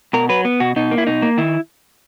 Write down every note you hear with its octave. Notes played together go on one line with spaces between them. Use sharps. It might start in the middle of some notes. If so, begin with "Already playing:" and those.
B2 A#4
F#3 B4
B3
B2 F#4
B2 D#4
A#3
E4
B2 D#4
A#3
D#3 E4